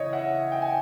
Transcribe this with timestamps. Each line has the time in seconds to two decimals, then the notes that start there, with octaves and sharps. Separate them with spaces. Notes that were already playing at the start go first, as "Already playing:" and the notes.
Already playing: C#3 E3 C#5 D#5
0.13 E5 F#5
0.52 G5
0.62 G#5